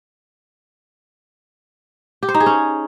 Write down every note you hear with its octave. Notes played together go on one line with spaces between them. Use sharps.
G4
C5
D#4
G#4
C#4